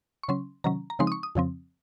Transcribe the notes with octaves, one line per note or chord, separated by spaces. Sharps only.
C#6
C#3 F#3 C#4 C6
C3 D#3 F#3 C#4 A#5
A#5
C#3 F3 G#3 C4 D#4 C6
D#6
C#6
D#6
F2 C#3 F3 C4